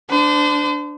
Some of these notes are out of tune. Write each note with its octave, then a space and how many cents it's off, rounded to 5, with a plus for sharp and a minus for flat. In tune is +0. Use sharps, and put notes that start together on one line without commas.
D4 +0 C5 -35